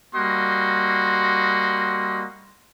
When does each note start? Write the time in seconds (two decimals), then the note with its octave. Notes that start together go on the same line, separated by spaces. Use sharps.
0.16 G3 A#3 F#4 D#5 C6